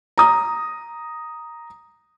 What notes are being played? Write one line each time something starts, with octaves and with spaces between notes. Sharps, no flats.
A#5 D#6